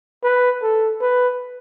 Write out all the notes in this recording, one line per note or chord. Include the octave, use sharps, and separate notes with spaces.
B4
A4
B4